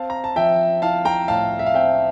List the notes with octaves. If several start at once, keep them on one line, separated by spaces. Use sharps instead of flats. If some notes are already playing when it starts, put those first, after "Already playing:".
Already playing: C4 F5 A5
A#5
A5
F3 E5 G5
E4 F5 A5
G5 A#5
A2 F5 A5
E5
F5
C4 E5 G5